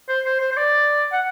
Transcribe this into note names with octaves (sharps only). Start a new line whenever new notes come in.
C5
C5
C5
C5
D5
F#5